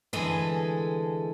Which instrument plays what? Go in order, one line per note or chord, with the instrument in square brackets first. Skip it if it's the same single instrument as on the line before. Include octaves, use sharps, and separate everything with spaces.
[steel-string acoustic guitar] D2 E3 G#3 G#4 A4 B4